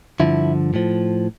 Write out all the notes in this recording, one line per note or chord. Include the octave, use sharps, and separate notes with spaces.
G2 D3 F3 E4
A2 F3